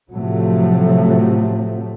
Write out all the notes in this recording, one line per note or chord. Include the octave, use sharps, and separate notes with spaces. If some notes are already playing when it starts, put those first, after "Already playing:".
A2 C3 F3 F#3 A3